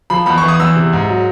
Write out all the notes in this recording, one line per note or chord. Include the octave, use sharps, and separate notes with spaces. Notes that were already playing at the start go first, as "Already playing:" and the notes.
F3 B5
E2 B5
C#6
E3
D#6
E2 E6
C3
G#2
F#3